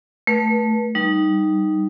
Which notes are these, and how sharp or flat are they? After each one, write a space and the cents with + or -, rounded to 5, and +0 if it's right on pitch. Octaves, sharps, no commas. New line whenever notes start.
A3 +0 B4 -40
G3 -15 D#4 -5